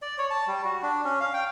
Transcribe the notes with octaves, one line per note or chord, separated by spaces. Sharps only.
D5
C#5
A5
G3
F#4
D4
C#4
F5
G5